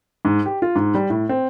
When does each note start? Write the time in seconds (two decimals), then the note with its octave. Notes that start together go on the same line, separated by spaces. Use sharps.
0.25 G#2
0.46 G4
0.62 F4
0.75 G#2
0.94 G3
1.10 A2
1.29 C4